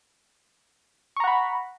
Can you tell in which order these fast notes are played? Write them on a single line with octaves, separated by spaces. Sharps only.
C#6 A#5 F#5 B5